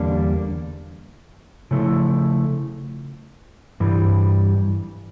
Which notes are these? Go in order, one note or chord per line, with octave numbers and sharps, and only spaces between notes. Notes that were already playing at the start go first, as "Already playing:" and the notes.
Already playing: E2 D3 G3 A#3 D4
C#3 F3 A3 E4
G2 E3 G3